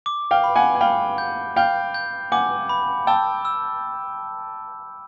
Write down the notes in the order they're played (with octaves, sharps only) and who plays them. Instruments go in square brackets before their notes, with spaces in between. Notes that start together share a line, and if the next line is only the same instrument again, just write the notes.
[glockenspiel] D6
[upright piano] F5 G5
[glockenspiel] B5
[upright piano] F#5 G#5
G#5
[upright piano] F5 G5 [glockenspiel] B5
[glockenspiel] G6
[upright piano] F5 G5 [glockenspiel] G6
[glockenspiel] G6
[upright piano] F#5 G#5 [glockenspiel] D6
[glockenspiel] B5
[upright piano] G5 A5 [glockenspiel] E6
[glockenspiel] E6